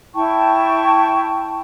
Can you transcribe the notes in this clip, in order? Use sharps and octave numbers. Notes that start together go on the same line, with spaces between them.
E4 G5 A5 C#6